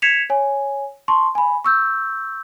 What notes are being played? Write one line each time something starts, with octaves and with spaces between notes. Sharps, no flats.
G#6 B6 C#7 E7 F7
C#5 G#5
A5 C6 C#6
G#5 B5
C#6 E6 G6